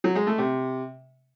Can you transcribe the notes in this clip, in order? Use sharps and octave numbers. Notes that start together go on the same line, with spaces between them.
F#3
G#3
A3
C3